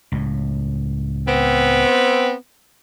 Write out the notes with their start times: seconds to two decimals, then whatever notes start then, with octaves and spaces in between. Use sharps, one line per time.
0.12 C#2 A2
1.26 B3 C4